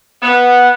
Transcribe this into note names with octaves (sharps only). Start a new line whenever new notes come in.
B3